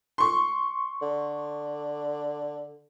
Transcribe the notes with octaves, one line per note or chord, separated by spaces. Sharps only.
C6 C#6
D3